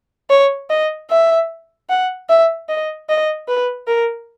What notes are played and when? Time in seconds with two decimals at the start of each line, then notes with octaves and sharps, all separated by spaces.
0.30 C#5
0.70 D#5
1.10 E5
1.90 F#5
2.29 E5
2.69 D#5
3.09 D#5
3.48 B4
3.88 A#4